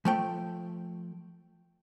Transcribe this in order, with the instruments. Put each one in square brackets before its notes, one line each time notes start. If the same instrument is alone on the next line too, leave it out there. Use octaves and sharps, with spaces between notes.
[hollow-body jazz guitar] F3 A3 G5